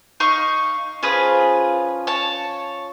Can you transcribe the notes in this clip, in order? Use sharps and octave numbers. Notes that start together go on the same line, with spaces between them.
D#4 F5 C#6
F3 C#4 F4 G#4 B4
C#5 A5